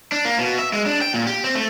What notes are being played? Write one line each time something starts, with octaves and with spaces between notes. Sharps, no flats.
D4
A#3
B2
E5
G#3
D4
G5
A#2
G4
C4
A3